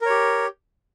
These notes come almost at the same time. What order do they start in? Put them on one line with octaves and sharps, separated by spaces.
A#4 C#5 G4